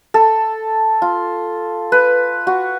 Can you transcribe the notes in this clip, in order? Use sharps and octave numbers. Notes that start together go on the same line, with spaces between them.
A4
F4
B4
F#4